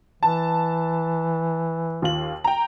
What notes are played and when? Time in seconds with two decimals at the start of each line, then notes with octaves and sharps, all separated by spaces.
0.23 E3 A5
2.02 D#2 F4 F#7
2.44 G5 A#5